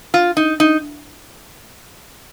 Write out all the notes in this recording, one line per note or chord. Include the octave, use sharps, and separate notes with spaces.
F4
D#4
D#4